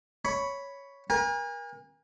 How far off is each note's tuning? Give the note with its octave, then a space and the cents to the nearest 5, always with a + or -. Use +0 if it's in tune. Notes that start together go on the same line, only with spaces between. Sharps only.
C#5 +5 B5 +0
A#4 +35 G#5 -35